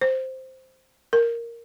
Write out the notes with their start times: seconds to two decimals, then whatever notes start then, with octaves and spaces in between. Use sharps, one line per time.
0.01 C5
1.13 A#4